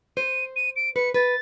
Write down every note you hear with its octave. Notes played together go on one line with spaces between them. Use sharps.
C5 D#7
D#7
D7
B4 C#7
B4 A6